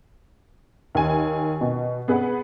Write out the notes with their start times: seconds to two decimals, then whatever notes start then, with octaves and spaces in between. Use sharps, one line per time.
0.95 D#2 G#5
1.61 B2
2.08 B3 G#4 B4 F#5